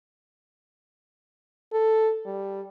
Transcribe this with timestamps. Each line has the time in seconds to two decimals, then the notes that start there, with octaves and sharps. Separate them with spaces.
1.73 A4
2.26 G3